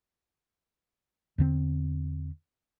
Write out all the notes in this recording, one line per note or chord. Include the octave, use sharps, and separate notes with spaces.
E2 D3 C4